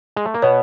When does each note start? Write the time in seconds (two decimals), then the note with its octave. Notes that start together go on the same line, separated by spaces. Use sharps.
0.16 G#3
0.25 A3
0.34 A#3
0.42 B2 B3 C#5